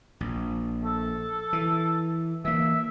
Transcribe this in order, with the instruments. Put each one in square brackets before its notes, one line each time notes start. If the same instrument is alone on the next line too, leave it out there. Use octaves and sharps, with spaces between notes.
[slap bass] A#1
[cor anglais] A4
[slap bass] E3
[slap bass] E3 A#3 [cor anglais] E5